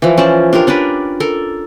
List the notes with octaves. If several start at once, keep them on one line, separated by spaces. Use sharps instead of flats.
E3 F3
C#4 C5 D5 A5
D4 F4 G4 A#4
C#4 D4 A#4 B4
A4 A#4